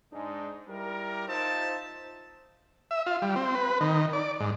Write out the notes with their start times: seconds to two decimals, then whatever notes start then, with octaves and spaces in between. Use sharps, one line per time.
0.12 G#2 G#3 D4 D#4
0.68 G3 E4 A#4
1.27 D#4 F4 C5 E5 A5
2.91 E5
3.06 F4
3.22 G3
3.36 C4
3.55 B4
3.81 D#3
4.13 D5
4.40 G#2